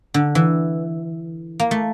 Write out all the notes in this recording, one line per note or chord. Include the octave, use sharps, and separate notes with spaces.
D3
E3
A#3
A3